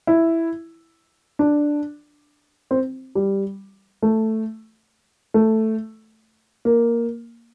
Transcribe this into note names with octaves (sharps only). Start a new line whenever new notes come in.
E4
D4
C4
G3
A3
A3
A#3